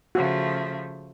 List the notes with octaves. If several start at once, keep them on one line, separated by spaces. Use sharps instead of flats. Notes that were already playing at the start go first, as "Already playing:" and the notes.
C#3 F3 A3 F#4